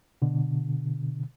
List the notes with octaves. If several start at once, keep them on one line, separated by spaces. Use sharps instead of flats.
B2 D3